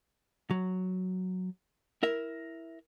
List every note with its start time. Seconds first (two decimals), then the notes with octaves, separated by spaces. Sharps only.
0.51 F#3
2.03 E4 A#4 E5